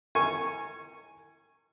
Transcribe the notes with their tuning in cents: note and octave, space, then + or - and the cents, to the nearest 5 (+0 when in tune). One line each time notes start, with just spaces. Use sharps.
A#4 -40 G#5 +0 C#6 -10